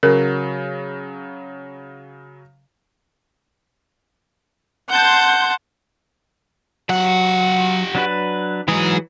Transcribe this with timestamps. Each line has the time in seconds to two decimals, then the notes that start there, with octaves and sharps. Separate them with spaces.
0.03 C#3 F#3 A#4
4.90 F#5 A5 C6 G6
6.89 F#3 G4 F#5
7.95 F#3 D4 B4
8.68 G#2 E3 F#3 G#4